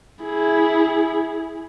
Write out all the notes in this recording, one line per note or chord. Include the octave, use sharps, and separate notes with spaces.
E4 G#4